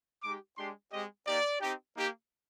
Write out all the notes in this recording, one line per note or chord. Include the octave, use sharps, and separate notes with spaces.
G#3 D#4 G4 D6
G#3 D4 G4 C6
G#3 C4 G4 D#5
A#3 D#4 G4 D5
C4 D#4 G4
A#3 D#4 G4